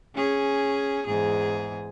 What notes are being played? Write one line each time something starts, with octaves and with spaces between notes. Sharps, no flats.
C#4 G#4
E2 G#2 G#4